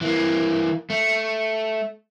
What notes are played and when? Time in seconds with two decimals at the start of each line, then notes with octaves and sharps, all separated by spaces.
0.01 E3 A#3
0.90 A3